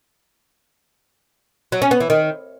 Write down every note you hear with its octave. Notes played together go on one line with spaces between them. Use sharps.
F#3
C#4
B3
E3
D#3